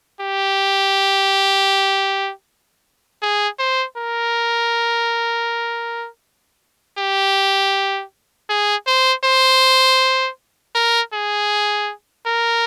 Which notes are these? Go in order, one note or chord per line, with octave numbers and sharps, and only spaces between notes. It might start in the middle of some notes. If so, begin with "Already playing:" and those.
G4
G#4
C5
A#4
G4
G#4
C5
C5
A#4
G#4
A#4